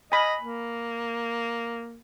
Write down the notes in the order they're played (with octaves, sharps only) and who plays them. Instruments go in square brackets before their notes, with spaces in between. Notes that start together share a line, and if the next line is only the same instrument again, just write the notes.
[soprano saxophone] D#5 [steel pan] G#5 B5
[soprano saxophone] A#3